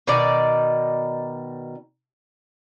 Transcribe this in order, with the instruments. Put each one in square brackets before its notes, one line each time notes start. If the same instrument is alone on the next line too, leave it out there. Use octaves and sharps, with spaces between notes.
[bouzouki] B2 D#3 D#4 D5